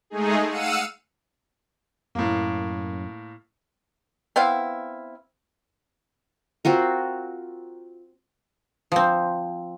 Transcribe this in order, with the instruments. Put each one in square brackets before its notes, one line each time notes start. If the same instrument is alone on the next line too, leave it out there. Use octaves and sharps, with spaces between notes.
[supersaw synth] G#3 A3 D#4 G#4
F5 F#5 E6 C#7 D#7
[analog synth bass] F#2 [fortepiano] A2 A#3
[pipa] B3 C4 E4 F5
[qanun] C4 F4 F#4 A#4
[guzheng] F3 C4